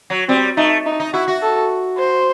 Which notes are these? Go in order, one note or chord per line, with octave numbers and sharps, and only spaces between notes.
F#3
G3 C4
A3 D#4
D#4
D#4
E4 F#4
F#4
A4
C5